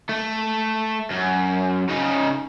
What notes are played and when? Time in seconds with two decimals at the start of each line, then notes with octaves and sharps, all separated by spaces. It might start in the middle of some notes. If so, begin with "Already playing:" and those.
0.09 A3
1.11 F#2
1.89 C#3 D#4